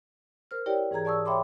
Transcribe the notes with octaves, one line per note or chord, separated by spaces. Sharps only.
A#4 C5 F6
E4 G4 A#4 C#5 D5 G5
G#2 E3 G#4 A#5 G#6
D5 A5 C#6 D#6 E6
C#5 E5 G5 B5 C6 D6